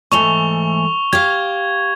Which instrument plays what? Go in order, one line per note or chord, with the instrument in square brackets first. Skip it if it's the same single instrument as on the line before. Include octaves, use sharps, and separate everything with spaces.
[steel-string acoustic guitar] G#2 E3 A3 [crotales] C#6 F7 G7
[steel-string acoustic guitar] G4 F5 [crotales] G#6